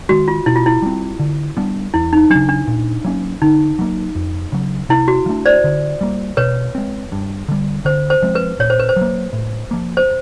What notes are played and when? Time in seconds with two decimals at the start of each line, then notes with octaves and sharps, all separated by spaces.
0.09 D#3 G#3 F#4
0.28 F4
0.46 B2 E4
0.56 F4
0.66 E4
0.82 G3 C4
1.19 D3
1.57 G3 B3 D4
1.94 E2 E4
2.13 D#4
2.30 C#3 F#3 D4
2.49 D4
2.67 A#2
3.05 F#3 A#3 C#4
3.42 D3 D#4
3.79 F#3 A#3
4.15 F2
4.52 C#3 F#3
4.89 C3 E4
5.08 F#4
5.26 F3
5.29 A3 D4
5.46 C5 D5
5.64 D3
6.01 G3 A#3
6.37 B2 B4 C#5
6.75 G#3 C4
7.12 G2
7.48 D3 G3
7.85 D3 C5
8.10 C5
8.23 F3 G#3 C4
8.35 B4
8.59 A#2 C#5
8.70 C5
8.79 B4
8.89 C5
8.96 F#3
9.01 A#3
9.33 A2
9.71 F3 A#3
9.97 C5